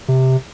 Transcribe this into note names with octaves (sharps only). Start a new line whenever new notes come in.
C3